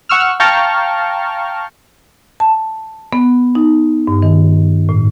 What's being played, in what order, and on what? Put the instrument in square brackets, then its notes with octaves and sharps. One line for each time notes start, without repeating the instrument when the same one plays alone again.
[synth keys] F#5 C#6 E6 F6
F5 G5 A5 A#5 C#6 F6
[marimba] A5
B3
D#4
G2
D#3
A2